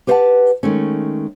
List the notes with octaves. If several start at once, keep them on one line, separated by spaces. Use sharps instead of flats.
G4 B4 C5 F5 F#5 A5
D#3 G#3 A3 C#4